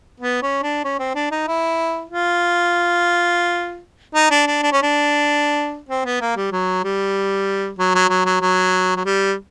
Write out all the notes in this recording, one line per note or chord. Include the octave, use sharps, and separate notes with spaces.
B3
C#4
D4
C#4
C4
D4
D#4
E4
F4
D#4
D4
D4
D4
C#4
D4
C4
B3
A#3
G3
F#3
G3
F#3
F#3
F#3
F#3
F#3
F#3
G3